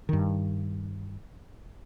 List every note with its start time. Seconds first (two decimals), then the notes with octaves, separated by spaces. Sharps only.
0.09 G2 D#3